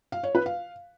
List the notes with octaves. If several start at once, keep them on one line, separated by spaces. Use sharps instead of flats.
F5
C#5
B4
F5